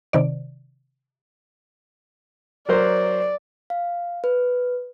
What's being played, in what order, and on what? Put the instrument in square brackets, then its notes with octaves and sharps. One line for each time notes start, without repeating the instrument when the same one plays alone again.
[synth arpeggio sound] C3 D#3 D5
[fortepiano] F#3 A#4 C5 [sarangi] D5
[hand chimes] F5
B4